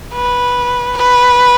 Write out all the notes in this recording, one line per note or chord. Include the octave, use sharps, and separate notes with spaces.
B4
B4